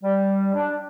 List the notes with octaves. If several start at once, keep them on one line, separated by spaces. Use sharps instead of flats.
G3
D4